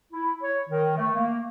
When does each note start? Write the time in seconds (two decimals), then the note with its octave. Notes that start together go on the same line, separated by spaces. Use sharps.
0.13 E4
0.42 C#5
0.69 D#3
0.97 A3
1.15 A#3